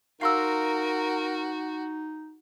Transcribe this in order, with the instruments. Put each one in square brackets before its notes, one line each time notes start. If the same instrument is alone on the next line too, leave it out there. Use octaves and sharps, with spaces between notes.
[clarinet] D#4 [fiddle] F#4 [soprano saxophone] A#4 [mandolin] F5 C6 E6